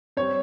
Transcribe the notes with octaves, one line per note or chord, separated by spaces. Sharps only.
G3 C4 C#5